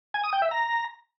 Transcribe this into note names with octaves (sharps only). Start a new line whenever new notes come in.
G#5
D#6
G5
E5
A#5